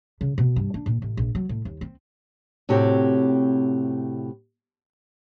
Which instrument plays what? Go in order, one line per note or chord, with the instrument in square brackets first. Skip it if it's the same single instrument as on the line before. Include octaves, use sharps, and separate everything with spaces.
[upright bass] C#3
B2
G2
D4
A#2
A1
A#1
F#3
A2
D#2
C4
[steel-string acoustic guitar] A2 C3 C4 F#4 G4 C#5